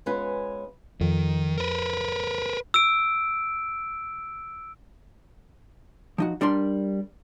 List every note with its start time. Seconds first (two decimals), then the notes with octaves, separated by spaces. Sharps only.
0.06 G#3 B3 C#4 F4 B4
1.01 F2 D#3
1.58 A#4 B4
2.74 E6 D7
6.18 F3 D#4 F#4
6.41 G3 D4 A#4 C6